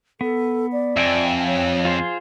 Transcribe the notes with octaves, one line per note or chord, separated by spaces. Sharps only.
B3 A4
D5
F2 E5 G5 G#5
C#5
F4 G#4 C5